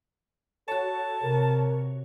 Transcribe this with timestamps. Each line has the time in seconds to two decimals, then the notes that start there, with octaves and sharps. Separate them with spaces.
0.68 F#4 A4 C#5 A5
1.23 C3 A#4